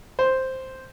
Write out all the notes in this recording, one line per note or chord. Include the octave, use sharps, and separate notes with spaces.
C5